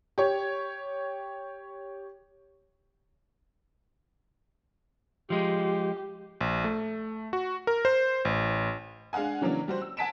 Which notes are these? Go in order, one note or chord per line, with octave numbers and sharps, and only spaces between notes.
G4 C#5
F3 G#3 G4
A#1
A3
F#4
A#4
C5
A1
G#3 D4 F5 F#5 G#5
C#3 E3 F#3 A#3 C#4 D4
G3 F#4 C5
E6
F#5 G#5 A5 B6 D7 E7